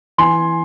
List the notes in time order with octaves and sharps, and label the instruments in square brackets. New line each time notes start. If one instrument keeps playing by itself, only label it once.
[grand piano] E3 G#5 C6